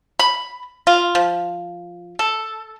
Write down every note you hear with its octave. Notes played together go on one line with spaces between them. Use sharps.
B5
F4
F3
A4